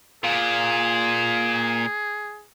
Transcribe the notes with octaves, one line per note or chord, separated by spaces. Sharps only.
A#2 G#4